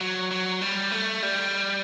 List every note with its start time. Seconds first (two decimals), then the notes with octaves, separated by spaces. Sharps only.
0.01 F#3
0.31 F#3
0.61 G3
0.92 A3
1.22 G3